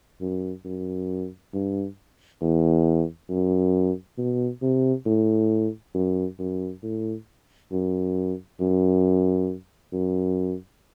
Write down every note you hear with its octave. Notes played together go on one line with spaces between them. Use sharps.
F#2
F#2
G2
E2
F#2
B2
C3
A2
F#2
F#2
A2
F#2
F#2
F#2